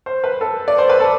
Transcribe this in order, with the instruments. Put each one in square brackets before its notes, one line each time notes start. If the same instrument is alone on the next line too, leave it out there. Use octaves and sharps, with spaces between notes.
[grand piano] C5
B4
A4
D5
C5
B4
A4